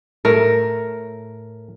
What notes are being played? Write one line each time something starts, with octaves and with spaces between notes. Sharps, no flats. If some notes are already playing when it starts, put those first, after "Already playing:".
A2 A3 A#4